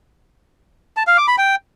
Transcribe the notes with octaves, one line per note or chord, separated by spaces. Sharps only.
A5
F5
D6
B5
G5